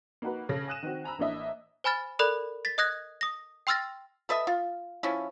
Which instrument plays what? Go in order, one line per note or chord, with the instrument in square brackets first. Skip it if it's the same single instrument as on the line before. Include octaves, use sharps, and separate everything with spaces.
[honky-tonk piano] A#3 D#4 F#4 B4
C#3 A4 A#6
G#5 D#6 F#6 D#7 E7
D#3 C4 F#4
G#5 A#5 B5 E6
A1 A#3 D4 E4 D#5 E5
[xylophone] C5 G#5 B5 F6 A6
A4 A#4 D5 B5 F#6
A6 B6
D#5 D#6 F#6 G#6 A#6
D#6 A#6
G5 C6 E6 F6 A6 A#6
[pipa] A4 B4 D#5 E5
F4
F3 C#4 E4